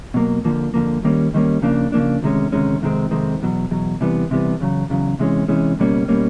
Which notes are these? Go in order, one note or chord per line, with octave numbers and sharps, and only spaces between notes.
B2 F#3 A#3
F2 D3 F3 A#3
F2 D3 F3 A#3
D#2 D#3 G3 A#3 C#4
D#2 D#3 G3 A#3 C#4
C#3 F3 A#3 D4
C#3 F3 A#3 D4
D2 C3 D#3 G#3 C#4
D2 C3 D#3 G#3 C#4
F2 C3 D#3 G#3 C4
F2 C3 D#3 G#3 C4
E2 B2 F#3
E2 B2 F#3
C2 C3 E3 G3 B3
C2 C3 E3 G3 B3
E2 C#3 F#3
E2 C#3 F#3
C3 E3 G#3 C#4
C3 E3 G#3 C#4
C#2 B2 G3 A#3 C#4
B2 G3 A#3 C#4